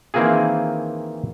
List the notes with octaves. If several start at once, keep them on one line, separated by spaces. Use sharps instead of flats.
D#3 E3 A#3 C4 F4 G#4